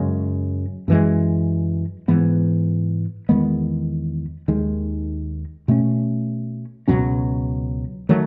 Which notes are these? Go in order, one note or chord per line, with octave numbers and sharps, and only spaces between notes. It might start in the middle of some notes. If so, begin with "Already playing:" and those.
Already playing: F#2 C#3 G#3
F#2 E3 G#3
G#2 E3 B3
E2 D#3 G#3 B3
D#2 D#3 G#3
B2 A3 C#4
C#2 B2 F#3 C#4
D#3 F#3 A3